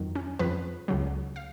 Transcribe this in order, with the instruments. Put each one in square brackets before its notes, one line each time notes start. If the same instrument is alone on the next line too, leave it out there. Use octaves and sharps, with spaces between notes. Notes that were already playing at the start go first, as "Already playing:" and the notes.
Already playing: [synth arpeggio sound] F2 D#3 F#3
C#4
F2 C#3 F3 B4
C#2 C#3 F#3
F5